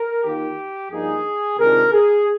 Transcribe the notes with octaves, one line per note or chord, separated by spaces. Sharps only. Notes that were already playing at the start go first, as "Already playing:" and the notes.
Already playing: A#4
D#3 A#3 F4 G4
G2 F3 A#3 D#4 G#4
C3 D#3 G#3 D4 F4 A#4
G#4